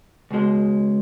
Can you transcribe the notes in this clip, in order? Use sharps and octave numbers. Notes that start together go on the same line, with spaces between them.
C#2 B2 G#3